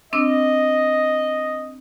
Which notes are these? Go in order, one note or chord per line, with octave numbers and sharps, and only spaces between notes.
C4 D4 D#5 E6